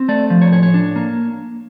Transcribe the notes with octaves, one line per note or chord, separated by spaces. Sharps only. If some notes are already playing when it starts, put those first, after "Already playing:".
Already playing: C4
A3 D5
F3
C#5
A2 C#5
C#5
D4
A#3